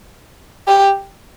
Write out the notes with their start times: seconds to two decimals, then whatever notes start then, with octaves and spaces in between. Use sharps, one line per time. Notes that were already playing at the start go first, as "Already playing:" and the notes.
0.67 G4